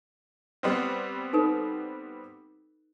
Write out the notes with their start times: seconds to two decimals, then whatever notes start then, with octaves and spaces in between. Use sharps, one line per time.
0.63 G3 B3 C4
1.33 D#4 A4 B4